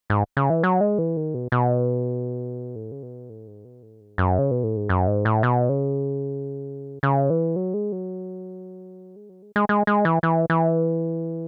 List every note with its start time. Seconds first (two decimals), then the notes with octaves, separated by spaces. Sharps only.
0.10 G#2
0.37 C#3
0.50 E3
0.63 F#3
0.81 G#3
0.98 E3
1.17 D#3
1.34 B2
1.52 B2
2.76 A2
2.92 C#3
3.03 B2
3.30 A2
3.47 G#2
3.65 B2
3.83 A2
4.01 G#2
4.18 F#2
4.39 C#3
4.51 B2
4.64 A2
4.77 G#2
4.89 F#2
5.07 G#2
5.25 A2
5.43 B2
5.69 C#3
7.03 C#3
7.30 E3
7.56 F#3
7.74 G#3
7.92 F#3
9.16 G#3
9.29 F#3
9.42 G#3
9.56 G#3
9.69 G#3
9.87 G#3
10.05 E3
10.23 E3
10.50 E3